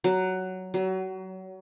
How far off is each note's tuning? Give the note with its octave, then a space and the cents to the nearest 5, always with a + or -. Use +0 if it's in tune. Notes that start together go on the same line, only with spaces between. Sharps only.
F#3 +10
F#3 +30